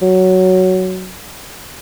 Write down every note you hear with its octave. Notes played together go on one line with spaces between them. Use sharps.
F#3